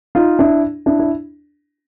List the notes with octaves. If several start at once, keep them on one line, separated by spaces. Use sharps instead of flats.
D#4 F4
D4 E4
D4 E4
E4